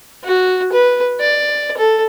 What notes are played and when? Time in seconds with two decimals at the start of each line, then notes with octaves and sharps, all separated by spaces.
0.24 F#4
0.72 B4
1.20 D5
1.77 A4